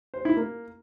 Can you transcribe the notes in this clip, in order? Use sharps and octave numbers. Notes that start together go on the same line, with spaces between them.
C5
E4
A#3